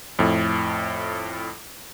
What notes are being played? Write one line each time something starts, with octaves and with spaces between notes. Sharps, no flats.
F2 A2